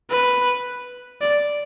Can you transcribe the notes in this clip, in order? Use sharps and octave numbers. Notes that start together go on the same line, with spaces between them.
B4
D5